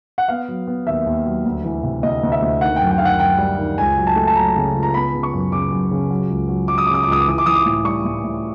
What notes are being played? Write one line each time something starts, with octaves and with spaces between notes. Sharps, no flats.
F#5
B3 F5
F#3
B3
D#2 E5
D#2
F#3
D2
E3
C3
D2 D#5
D2
E5
D2
D#3 F#5
F#2 G5
G5
D#3 F5
F#5
F#2 G5
G3
D#3
C#2 G#5
F#3
A5
A3
A5
F#3 A#5
C#3
C#2
A#5
B3 B5
C#3
C#6
F#2
C#3 D6
F#2
C#3
F#3
C#2
F#3
F#3 D6
D#6
C#3 D6
D#6
D6
C#2 D#6
D6
E3 D#6
D6
E3 D#6
D6
A2
G3 C#6
A2
A2